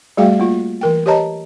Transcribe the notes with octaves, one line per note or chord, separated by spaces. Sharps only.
G3 A3 F#4 G#4 F5 G5
A#3 F4
E3 A#4 G5
G4 B4 C#5 D#5 A5 A#5